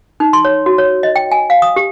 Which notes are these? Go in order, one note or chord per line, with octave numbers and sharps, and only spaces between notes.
D#4
C6
C#5
F#4
C#5
D#5
G5
G#5
F5
D#6
G4